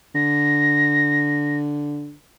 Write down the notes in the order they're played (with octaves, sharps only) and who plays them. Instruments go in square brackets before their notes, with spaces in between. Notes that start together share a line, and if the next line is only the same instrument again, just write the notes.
[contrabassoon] D3 [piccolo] A#6